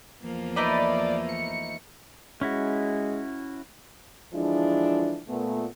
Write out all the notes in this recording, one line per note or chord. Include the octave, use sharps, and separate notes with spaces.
E2 F3 A#3
A3 D#4 B4 D5
C#7
G#3 C#4 E4 F#4
D3 E3 F3 G#3 D4 E4
A#2 A3 B3